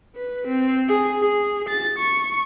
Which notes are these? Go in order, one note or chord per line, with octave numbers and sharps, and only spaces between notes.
B4
C4
G#4
G#4
A6
C#6